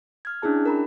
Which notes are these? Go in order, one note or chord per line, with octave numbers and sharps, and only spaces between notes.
F6 G#6
C#4 D4 E4 G#4 A5
A#4 A#5 B5